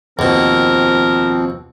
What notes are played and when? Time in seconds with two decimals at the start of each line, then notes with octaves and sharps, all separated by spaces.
0.19 D#2 B2 F3 C4 A#4